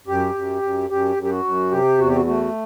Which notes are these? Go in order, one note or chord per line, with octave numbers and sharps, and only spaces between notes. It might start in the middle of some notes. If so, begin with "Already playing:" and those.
F#2 G4
F#2
F#2
F#2 G4
F#2
G4
F#4
F#2
C3 G4
E2 F#4
G4
F#4
A3 F#4